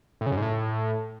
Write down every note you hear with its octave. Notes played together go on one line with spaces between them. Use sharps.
A2
C#3
F#2
G#2
A2